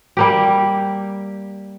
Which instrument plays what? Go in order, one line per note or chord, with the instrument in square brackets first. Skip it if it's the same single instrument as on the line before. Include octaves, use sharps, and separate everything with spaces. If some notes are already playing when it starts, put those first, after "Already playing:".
[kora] G3 A#3 G4